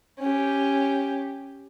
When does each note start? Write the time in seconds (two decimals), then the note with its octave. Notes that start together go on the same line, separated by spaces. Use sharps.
0.19 C#4 G4